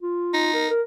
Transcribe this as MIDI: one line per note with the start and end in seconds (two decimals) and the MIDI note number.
0.02 0.50 65
0.34 0.69 63
0.54 0.70 70
0.71 0.82 70